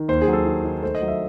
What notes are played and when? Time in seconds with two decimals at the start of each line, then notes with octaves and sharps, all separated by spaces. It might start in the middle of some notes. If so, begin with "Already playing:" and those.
Already playing: D#3
0.08 D#2 C5
0.22 G#4
0.28 F#3
0.33 A4
0.46 D#3
0.64 D#3
0.82 A3 C5
0.95 D#5
1.02 F#3
1.08 E5